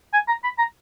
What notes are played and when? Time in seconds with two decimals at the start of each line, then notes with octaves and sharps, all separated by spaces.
0.13 G#5
0.28 A#5
0.44 B5
0.58 A#5